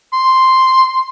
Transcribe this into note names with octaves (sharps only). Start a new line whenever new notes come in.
C6